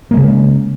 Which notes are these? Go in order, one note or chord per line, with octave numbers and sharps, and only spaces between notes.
C#3 G#3 A#3